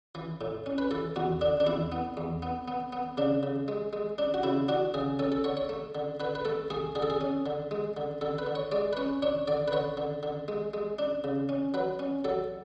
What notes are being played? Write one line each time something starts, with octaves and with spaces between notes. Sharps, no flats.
E3
A2
C#4
B4
E3 A4
E2 F#4
D3 D4
D4
E2 E4
B3
E2
B3
B3
B3
C#3 D4
C#3
G#3
G#3
D4
F#4
C#3 E4
D4 F#4
C#3 G#4
C#4 A4
A4
D3 C#5
C#5
A3
D3
D3 B4
B4
A3 A4
A3 G#4
D3 G#4
A4
G#4
C#4
D3
G#3
D3
D3 A4
B4
D3
C#5
G#3 D5
B4
C#4 C#5
D4 C#5
D3 D5
B4
D3 C#5
D3
D3
G#3
G#3
D4
C#3
C#4
F#3 B4
C#4
F#3 A4